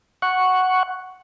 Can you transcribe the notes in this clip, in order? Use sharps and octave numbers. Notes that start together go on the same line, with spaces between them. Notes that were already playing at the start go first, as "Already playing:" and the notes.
F#5 C#6